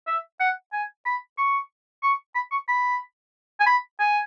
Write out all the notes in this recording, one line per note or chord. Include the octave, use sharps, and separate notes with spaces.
E5
F#5
G#5
B5
C#6
C#6
B5
C#6
B5
G#5
B5
G#5